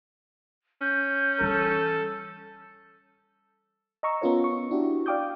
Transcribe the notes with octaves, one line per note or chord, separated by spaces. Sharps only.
C#4 G6
E3 G3 A4
D#5 A#5 C#6 E6
B3 C#4 F4 A#4 C#5
C#6
D4 E4 F#4 G4
D5 F5 G5 D6 D#6 G6